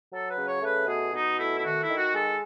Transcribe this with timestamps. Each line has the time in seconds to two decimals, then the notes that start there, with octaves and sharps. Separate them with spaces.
0.12 F#3 A4
0.29 B4
0.37 C#3
0.46 C#5
0.62 A3 B4
0.87 B2 G#4
1.13 B2 D#4
1.38 A3 E4
1.57 E4
1.64 D#3 F#4
1.81 E4
1.89 D#3
1.97 F#4
2.14 G#3 A4